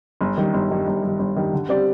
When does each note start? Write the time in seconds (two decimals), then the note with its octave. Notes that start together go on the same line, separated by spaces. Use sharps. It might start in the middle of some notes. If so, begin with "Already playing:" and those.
0.21 G1
0.37 G2 D#3
0.54 G1
0.70 G2 D#3
0.87 G1
1.03 G2 D#3
1.19 G1
1.36 G2 D#3
1.53 D3
1.69 G3 C4 G4 D5